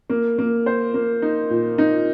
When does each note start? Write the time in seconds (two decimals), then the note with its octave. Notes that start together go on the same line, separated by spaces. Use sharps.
0.10 A#3
0.38 A#3
0.66 C5
0.94 A#3
1.22 D#4
1.50 A#2
1.78 D#4